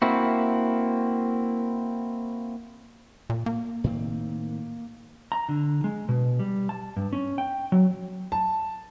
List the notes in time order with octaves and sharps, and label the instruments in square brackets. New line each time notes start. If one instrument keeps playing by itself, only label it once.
[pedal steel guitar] A#3 C4 E4 F#4
[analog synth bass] A#2
A#3
[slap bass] A2 D#3 C4
[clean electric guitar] A#5
D3
G#3
B2
G3
A5
G2
C#4
G5
F#3
[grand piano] A5